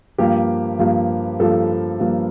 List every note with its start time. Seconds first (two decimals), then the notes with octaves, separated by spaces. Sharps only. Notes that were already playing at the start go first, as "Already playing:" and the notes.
0.18 G2 F3 A#3 G4
0.79 G2 F3 A#3
1.39 G2 F3 A#3 A4
2.00 G2 F3 A#3